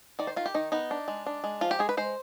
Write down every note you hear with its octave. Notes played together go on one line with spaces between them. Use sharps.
D#3 D5
C5
D#3 F4
G4
D#3 D#4
B3 D#4
D4
G#3
D4
G#3
F3 F4
G4
G#3 G#4
B4
G#3 C5